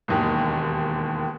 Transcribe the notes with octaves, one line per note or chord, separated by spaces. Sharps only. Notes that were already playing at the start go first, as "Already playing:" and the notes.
E1 D#2 D#3